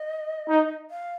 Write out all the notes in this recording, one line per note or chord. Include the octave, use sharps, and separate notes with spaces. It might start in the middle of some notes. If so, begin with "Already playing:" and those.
Already playing: D#5
D#4
F5